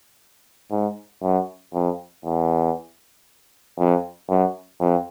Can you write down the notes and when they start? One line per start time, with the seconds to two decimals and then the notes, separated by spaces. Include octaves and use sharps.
0.71 G#2
1.22 F#2
1.74 F2
2.25 E2
3.79 F2
4.29 F#2
4.80 F2